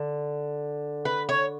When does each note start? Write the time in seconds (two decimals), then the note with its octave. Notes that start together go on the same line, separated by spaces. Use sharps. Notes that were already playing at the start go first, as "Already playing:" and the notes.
Already playing: D3
1.05 B4
1.29 C#5